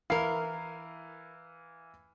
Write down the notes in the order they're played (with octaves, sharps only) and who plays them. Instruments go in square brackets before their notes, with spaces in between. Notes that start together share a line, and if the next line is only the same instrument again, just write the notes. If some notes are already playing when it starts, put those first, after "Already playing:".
[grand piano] E3 F5 C7 [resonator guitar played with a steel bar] E4 A#4